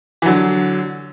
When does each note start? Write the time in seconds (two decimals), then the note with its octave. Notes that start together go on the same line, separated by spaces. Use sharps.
0.22 E3
0.26 D3 F#3